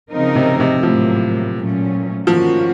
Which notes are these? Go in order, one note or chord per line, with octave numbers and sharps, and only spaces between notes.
C#3 F3 C4 D#4 A#4
C3
C3
A2 F3 F#3 A#3
A#2 F#3 A3 C#4
D#3 F3 A#3 C#4 F#4